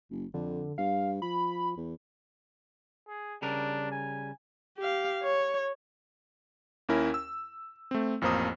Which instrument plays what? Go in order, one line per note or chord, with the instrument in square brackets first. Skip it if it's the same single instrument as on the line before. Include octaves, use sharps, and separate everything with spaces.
[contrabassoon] F#1
[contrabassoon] F2 [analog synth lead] D3
[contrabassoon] G2 [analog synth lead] F5
[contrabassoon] F3 [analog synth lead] B5
[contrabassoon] E2
[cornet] G#4
[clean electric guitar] C#3 G3 A#4 [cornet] D4
[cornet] G#5
[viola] G4 F5
C#5
[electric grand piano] D#2 C#4 E4 A#4 G#5
E6
A3 C4
A1 F2 A#3 C5 A#5 D#6